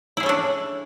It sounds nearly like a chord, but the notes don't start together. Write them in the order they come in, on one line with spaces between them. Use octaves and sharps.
E4 G#4 C#4 A4 D4